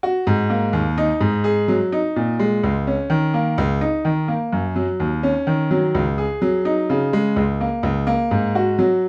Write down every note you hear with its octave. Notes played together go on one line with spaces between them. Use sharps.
F#4
G#2
A#3
D#2
D#4
G#2
G#4
F#3
D#4
A#2
G#3
C#2
C#4
D#3
A#3
C#2
D#4
D#3
A#3
F#2
F#3
D#2
C#4
D#3
F#3
C#2
G#4
F#3
D#4
C#3
G#3
C#2
A#3
C#2
A#3
G#2
F#4
F#3